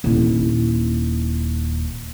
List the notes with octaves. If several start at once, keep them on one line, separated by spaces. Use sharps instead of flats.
D#1 E4